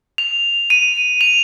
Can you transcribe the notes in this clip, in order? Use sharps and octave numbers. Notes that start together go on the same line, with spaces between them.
F7
D#7
F7